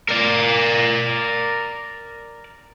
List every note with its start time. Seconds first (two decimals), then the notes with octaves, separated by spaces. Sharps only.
0.09 A#4 D5